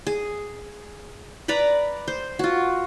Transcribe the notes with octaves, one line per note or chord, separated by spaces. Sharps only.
G#4
B4 D5 A#5 B5
C5
F4 F#4